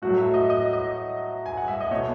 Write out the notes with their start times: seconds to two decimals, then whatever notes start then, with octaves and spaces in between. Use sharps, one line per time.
0.02 A2 F#3 A3 F#4
0.18 E5
0.34 D#5
0.50 D#5
0.73 D#5
1.46 G#5
1.57 F#5
1.68 E5
1.80 D#5
1.91 B2 A3 C#5